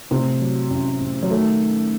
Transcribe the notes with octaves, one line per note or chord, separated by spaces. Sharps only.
A2 C3 C4
F#3
A1
A1
F#3
D#3 A3